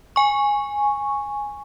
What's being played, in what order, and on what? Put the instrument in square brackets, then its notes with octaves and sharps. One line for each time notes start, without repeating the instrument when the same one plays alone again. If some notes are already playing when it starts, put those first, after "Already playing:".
[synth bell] G#5 C#6